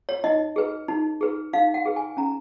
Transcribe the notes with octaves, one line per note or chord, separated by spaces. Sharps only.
C#5
D#4 D#5
G#4 B4
D#4
G#4 B4
D#4 F5
F#5
G#4 B4
G#5
C#4 A#5